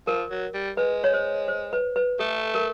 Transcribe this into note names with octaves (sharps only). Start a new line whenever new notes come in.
F3 A#4
F#3
G3
G#3 B4
C#5
C5
C5
B4
B4
A3 A4
A#4